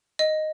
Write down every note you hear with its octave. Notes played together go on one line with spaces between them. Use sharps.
D#5